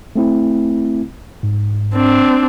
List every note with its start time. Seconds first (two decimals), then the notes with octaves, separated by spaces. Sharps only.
0.16 A3 C4 E4
1.43 G#2
1.94 C4 D4